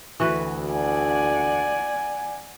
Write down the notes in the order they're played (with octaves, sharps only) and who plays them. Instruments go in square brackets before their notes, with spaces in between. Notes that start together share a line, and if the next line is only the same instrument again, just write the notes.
[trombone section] D2 [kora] E3 F#4 B4
[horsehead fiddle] D5 F#5 [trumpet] G#5